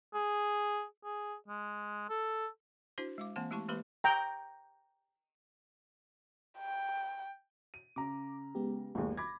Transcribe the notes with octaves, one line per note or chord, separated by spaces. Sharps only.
G#4
G#4
G#3
A4
D4 E4 F#4 C5
G#3 F5 D6
E3 A#3 C4 F#5 A5
G#3 A3 E4 G4 A5 C#6
E3 G#3 A#3 G4 B4 B5
G5 A#5
G5
D#7
C#3 A#5 D6
G#3 B3 G4
G1 D#2 A3 G#4
B5 D6 G#6 A#6